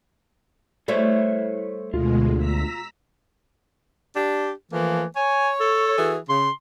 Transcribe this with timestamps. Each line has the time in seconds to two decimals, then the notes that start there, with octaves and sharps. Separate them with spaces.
0.88 G3 A3 E4 A4 C5 C#5
1.94 D2 B2 G#3 F4
2.38 A#5 E6 B6
4.15 D4 G4
4.71 E3 F3 A3 A#3
5.16 C#5 G#5
5.60 A4
5.96 E3 F#4 G#4
6.29 C#3 C6